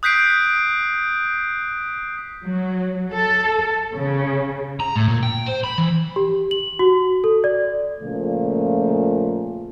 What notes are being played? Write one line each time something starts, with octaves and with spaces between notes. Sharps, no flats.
D#6 F#6 G6 B6 C7 D7
F#3
A4
C#3
A#5
A2
A#2
G5
C5
B5
E3
G4
F#7
F#4
A4
D5
A#2 C#3 F3 A3